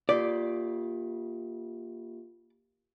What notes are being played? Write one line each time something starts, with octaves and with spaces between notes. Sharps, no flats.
A#3 F4 G4 D5